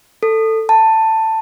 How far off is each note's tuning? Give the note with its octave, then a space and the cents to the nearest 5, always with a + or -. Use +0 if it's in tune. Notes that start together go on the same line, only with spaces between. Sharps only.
A4 +15
A5 +15